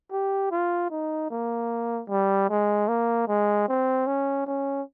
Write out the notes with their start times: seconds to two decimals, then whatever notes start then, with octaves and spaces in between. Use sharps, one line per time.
0.11 G4
0.51 F4
0.91 D#4
1.30 A#3
2.09 G3
2.49 G#3
2.88 A#3
3.28 G#3
3.68 C4
4.07 C#4
4.46 C#4